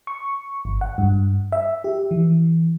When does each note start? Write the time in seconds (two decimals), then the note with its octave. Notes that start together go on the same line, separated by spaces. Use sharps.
0.07 C#6
0.65 G1
0.81 F#5
0.98 G2
1.52 E5
1.84 G4
2.11 E3